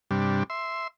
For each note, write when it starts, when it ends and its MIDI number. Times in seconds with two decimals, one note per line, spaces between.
0.11 0.43 43
0.11 0.43 48
0.11 0.43 55
0.11 0.43 62
0.50 0.88 76
0.50 0.88 84